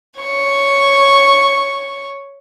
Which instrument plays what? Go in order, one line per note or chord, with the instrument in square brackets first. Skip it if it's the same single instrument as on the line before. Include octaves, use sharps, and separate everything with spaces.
[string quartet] C#5 C#6